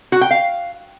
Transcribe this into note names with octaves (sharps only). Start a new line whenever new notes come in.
F#4
G5
F5